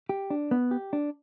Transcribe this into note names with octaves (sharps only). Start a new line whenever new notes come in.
G4
D4
B3
G4
D4